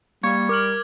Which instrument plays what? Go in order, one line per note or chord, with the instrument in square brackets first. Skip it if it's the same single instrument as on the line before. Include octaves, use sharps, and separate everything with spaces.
[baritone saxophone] G3 [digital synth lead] A#3 [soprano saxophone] C#6 [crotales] G#6
[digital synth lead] A#4 [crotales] D6 F6 F#7